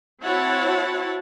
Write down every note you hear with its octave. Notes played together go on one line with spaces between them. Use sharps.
C4 E4 F#4 C#5 F#5 A5